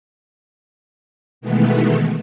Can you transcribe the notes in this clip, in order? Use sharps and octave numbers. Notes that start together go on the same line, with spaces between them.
B2 D#3 E3 G#3 A3 B3